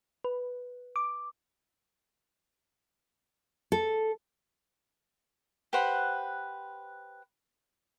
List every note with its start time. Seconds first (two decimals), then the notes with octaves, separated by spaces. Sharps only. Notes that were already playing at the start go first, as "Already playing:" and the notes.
0.24 B4
0.96 D6
3.72 A4
5.73 G4 B4 C5 F#5